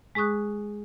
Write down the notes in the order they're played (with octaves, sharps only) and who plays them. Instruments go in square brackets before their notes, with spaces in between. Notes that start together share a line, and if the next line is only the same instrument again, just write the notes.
[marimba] G#3 G#4 C#6 D#6 F#6